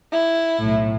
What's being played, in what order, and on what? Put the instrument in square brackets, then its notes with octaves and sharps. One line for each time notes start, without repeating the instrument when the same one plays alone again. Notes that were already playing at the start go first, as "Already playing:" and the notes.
[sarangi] E4
[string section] B1 A2